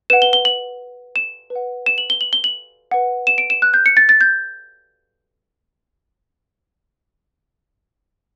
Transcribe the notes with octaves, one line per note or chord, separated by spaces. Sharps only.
B4 F#5 E7
G7
G7
F#7
E7
B4
F#5
E7
F#7
G7
F#7
G7
F#7
B4 F#5
E7
D7
E7
F#6
G6
C#7
A6
A6
G6